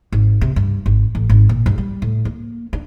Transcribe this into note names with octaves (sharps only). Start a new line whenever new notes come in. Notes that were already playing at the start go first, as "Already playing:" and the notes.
G#1
C3
G2
G#1
A1
G#1
A#2
G2
G3
A2
A#3
D4